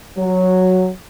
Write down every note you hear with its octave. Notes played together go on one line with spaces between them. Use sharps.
F#3